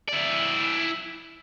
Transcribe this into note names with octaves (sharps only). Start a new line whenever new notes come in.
E4 D5